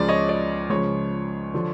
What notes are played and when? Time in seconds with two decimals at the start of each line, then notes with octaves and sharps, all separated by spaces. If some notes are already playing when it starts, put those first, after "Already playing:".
Already playing: C#2 C#3 F3 D5
0.08 C#5 D#5
0.29 D5
0.70 C#2 C#3 F3 C#5
1.54 D3 F3